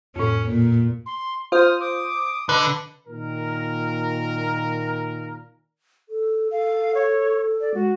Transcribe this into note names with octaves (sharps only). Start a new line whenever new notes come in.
F2 A2 C#4
A#2
C6
F4 C5 D#6 F6
D6 D#6
D3 B4 D#5
A#2 D#3 A#4
A4
A4 F5
C#5
D5
G#3 F#4